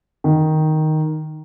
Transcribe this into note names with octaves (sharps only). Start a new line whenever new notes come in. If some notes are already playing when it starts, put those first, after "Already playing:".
D#3